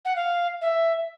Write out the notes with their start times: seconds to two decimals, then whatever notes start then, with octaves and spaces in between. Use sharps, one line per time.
0.05 F#5
0.16 F5
0.61 E5